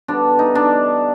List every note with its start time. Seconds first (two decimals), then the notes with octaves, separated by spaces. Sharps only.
0.08 D3 G3 B3 D4
0.39 D#4
0.55 D4